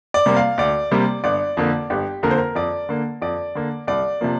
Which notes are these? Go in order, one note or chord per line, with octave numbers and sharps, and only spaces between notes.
D5
C3 G3 A#3
F5
D2 D5
C3 G3 A#3
G1 D5
F2 D3 A#3
G1 G4
F2 D3 A#3 A#4
C5
A#4
F2 D5
D3 A#3
F2 D5
D3 A#3
C2 D5
C3 F3 A#3